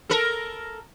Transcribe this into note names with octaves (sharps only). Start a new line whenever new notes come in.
A4 A#4